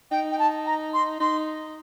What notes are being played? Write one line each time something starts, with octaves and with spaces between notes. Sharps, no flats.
D#4 G5
G5
A5
A#5
C6
D#4 C6